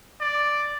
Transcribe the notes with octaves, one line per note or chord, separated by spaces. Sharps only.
D5